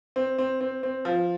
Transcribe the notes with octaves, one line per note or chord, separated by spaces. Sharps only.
C4
C4
C4
C4
F3